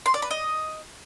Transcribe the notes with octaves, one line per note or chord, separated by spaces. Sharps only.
C6
D5
B4
D#5